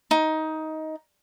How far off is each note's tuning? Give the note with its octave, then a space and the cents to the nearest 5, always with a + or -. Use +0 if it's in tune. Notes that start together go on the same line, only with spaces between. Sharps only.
D#4 +15